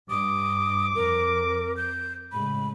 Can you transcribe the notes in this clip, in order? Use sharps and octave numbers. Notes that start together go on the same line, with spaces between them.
G2 D6 D#6
F2 A#4
G6
A2 C#3 G#3 B5